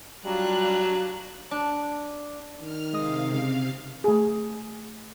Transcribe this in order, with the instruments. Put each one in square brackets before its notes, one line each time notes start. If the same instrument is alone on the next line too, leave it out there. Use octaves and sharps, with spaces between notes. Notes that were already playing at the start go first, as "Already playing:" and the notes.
[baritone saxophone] F#3 [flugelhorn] G3 [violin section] D4 F4 F#6
[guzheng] D4
[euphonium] D#3 [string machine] F6
[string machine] C3 F5 [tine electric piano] G#3 D#5 D#6
[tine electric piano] C#3
[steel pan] A3 G#4